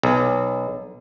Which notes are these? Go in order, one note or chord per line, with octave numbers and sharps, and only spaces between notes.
B1